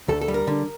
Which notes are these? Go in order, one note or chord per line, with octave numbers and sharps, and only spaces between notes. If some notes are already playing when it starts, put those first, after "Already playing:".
D2 A4
A4
G3
A#4
D3